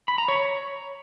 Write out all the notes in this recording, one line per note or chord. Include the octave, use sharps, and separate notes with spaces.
B5
A#5
C#5